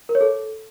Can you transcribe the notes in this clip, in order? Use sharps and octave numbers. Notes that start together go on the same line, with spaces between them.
A#4
C#5
A4